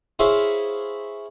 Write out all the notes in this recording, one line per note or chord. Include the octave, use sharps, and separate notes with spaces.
E4 G#4 C5 C#5 E5 F5